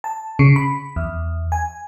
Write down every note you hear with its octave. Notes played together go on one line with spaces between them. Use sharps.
A5
C#3
B5
E2
G#5